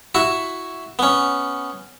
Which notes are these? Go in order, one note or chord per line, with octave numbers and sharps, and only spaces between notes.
E4 F#4 E5
B3 C#4